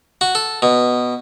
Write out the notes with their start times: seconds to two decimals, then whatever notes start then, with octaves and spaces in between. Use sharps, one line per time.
0.21 F#4
0.35 A4
0.62 B2